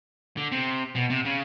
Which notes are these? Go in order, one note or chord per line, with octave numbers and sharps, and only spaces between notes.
D3
C3
B2
C3
C#3